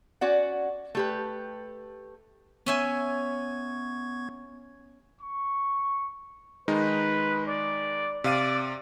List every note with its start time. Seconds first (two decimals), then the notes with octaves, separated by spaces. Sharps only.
0.21 C#4 F#4 D5 F#5
0.95 A3 G4 B4
2.66 B3 C#4 E5 G#5 C#6 G#6
5.20 C#6
6.68 D#3 G#3 D#4 B4
7.47 D5
8.24 C3 D5 F5 D#7